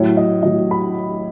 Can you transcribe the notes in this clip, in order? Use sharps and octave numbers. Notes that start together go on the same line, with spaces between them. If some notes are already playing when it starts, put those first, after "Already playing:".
Already playing: A2 F#3 C#5
D#5
A2 F#3 D#5
B5